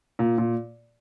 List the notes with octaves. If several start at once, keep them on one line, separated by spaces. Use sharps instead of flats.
A#2
A#2